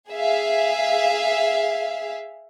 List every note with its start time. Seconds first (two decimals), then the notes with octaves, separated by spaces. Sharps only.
0.11 G#4 E5 F5